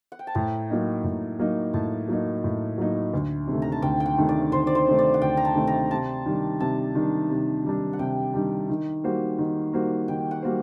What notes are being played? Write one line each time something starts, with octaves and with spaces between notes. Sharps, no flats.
F#5
G5
A5
A2 A#5
F#3 A#3 D#4
A2
F#3 A#3 D#4
A2 A5
F#3 A#3 D#4
A2
F#3 A#3 D#4
D2
C3 D#3 A3
A#5
A5
D2 G5
G5
F#5
C3 D#3 A3
D5
D2 C5
D5
C5
C3 D#3 A3
D5
F#5
D2 G5
A#5
A5
C3 D#3 A3
A#5
C3 A5
D#3 G3 D4
C3 A5
D#3 G3 D4
C3
D#3 G3 D4
F#5
C3 G5
D#3 G3 D4
D#3
G3 A#3 F#4 C5
D#3
G3 A#3 F#4 C5
D#3 G5
F#5
G3 A#3 F#4 C5